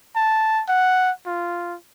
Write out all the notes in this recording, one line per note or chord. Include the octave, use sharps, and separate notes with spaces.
A5
F#5
F4